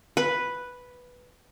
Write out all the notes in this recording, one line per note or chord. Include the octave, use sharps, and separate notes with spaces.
B4